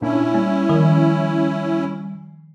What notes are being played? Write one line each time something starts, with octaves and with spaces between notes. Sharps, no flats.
A#2 A#3 C#4 D4 E4
G3 A#3 G#5
D#3 F3 A#4